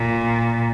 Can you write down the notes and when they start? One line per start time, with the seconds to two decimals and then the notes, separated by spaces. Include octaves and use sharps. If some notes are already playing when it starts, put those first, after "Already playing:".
Already playing: A#2